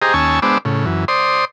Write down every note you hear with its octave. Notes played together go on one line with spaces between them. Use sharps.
G4 G#4 C5 D#5 A#5
D#2 C#4 G#5 A5 C#6 E6
G#3 B3 D4 C5 D6 E6
A2 C#3
F#2 E3
C5 D5 C6 D#6